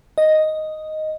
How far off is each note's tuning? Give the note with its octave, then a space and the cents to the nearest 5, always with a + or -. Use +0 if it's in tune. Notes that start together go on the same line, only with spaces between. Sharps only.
D#5 +0